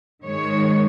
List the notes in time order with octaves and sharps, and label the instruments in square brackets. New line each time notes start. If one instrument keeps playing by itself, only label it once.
[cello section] G#2 D#3 G#3 C#5